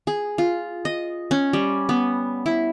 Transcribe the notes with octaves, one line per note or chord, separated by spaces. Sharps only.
G#4
F4
D#5
C#4
G3
B3
E4